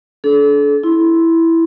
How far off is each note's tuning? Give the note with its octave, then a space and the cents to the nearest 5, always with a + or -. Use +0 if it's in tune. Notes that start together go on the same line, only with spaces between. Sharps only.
D4 -25 A4 -35
E4 +0 C6 +5